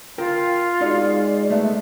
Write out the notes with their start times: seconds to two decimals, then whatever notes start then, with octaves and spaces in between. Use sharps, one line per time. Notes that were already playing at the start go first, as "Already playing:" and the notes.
0.18 F4 A#4 G5
0.81 G#3 D#4 F#4 D5
1.50 A3 B3 E5